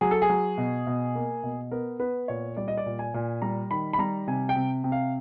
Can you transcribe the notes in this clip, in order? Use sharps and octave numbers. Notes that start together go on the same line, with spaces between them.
F#3 G#4
A4
G#4
F#3
B2
B2
A#3
B2
B3 A#4
B3 B4
A#2 C#5
G3 D5
D#5
D5
A#2
G#5
A#2
G3 A#5
D#3 B5
B5
G3 A#5
C3 G#5
G5
C3
C3
F5